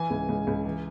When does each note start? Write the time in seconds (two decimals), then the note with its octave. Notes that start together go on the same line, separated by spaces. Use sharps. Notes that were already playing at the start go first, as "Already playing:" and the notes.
Already playing: E3 G#5
0.10 C#2
0.29 C#2
0.47 C#2
0.65 E3